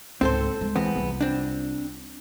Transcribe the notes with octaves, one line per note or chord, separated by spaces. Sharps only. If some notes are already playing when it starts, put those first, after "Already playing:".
C#2 G#2 C4 A4 C5
G#3
E2 B3 C4
C2 F4
C4 D4